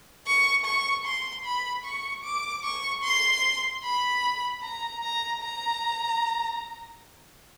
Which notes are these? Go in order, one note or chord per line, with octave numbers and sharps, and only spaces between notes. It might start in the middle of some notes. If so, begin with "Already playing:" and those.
C#6
C#6
C6
B5
C#6
D6
C#6
C6
B5
A#5
A#5
A#5